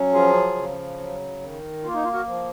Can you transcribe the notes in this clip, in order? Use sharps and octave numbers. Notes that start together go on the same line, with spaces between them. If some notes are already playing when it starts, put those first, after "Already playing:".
Already playing: F#3 C#4
F3 F4 G#4
C#3
F#3
D#3
A#3 F4
D#4
F4
F#4 A#4
F3